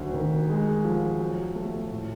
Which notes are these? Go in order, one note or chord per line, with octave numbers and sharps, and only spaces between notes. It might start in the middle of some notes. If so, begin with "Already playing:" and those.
Already playing: D2 F#3
D#3
G#3
F3
F#3
A3
A2